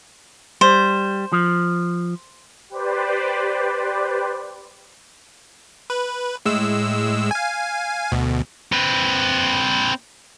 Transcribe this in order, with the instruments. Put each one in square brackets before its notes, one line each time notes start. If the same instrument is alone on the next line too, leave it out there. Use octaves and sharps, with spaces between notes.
[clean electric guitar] G3 [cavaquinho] C5
[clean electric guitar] F3
[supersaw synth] G4 B4 C5 D5
[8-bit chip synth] B4
A2 G#3 E6
F5 G#5
D2 B2
[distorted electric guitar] C4 B4